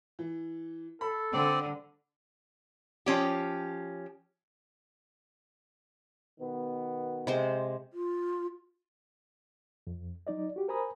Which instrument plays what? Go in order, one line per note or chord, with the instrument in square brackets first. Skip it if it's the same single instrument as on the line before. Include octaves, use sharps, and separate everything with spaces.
[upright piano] E3
[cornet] A4 [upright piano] B5
[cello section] D3 [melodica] C4 D5
[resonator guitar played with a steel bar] F3 C#4 G4
[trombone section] B2 D#3 B3
[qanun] C3 G#3 C5
[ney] F4
[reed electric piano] F2
F#3 D#4 D5 D#5
F#4 G4
A#4 C5 G#5 A#5 B5 D#6